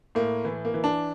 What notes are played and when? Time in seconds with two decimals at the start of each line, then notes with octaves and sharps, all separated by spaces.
0.15 A2 A#3
0.45 E3
0.65 A#3
0.74 E3
0.84 D4